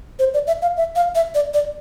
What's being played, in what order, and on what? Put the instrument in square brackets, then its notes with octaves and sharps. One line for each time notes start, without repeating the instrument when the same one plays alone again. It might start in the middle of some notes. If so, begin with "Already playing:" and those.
[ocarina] C5
D5
E5
F5
E5
F5
E5
D5
D5